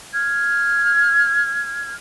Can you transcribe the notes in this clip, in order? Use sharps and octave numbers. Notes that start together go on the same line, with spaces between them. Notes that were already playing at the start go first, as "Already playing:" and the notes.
F6 G#6